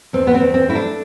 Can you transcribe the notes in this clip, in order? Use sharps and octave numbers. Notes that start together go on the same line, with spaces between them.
E2 C4
B3
C4
E2
C4
A3 E4
D4